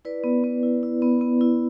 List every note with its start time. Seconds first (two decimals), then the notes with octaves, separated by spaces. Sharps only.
0.05 E4 B4 D5
0.24 B3
0.44 B3
0.63 E4
0.83 E4
1.02 B3
1.21 B3
1.41 E4